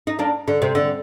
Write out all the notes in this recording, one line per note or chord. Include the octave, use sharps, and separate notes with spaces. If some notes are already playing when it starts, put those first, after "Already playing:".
D#4
A#3 D4
D3
C3
D3